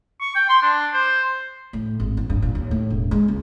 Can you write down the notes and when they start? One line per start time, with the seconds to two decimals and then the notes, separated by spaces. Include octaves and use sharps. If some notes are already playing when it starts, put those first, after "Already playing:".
0.21 C#6
0.35 G5
0.49 C6
0.62 D4
0.94 C5
1.73 A2
2.00 G#1
2.17 A1
2.30 G2
2.42 A#2
2.55 D#2
2.71 A2
2.90 E1
3.11 G#3
3.28 C#2